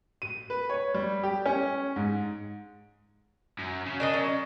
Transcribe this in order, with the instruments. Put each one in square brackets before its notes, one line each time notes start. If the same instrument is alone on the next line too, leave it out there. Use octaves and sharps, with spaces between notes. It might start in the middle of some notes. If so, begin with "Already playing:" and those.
[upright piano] D#7
B4
C#5
G3
G4
C#4
G#2
[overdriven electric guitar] F#2
C#3
[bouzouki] D4 A#4 D#5
F#3